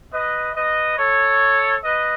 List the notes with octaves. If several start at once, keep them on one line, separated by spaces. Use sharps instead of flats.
B4 D#5
B4 D#5
A4 C#5
B4 D#5